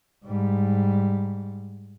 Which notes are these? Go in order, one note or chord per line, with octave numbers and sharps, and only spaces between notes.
G#2 G3